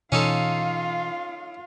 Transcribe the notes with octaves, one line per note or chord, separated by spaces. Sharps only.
B2 E3 C#4 D#4 F4 A4 F5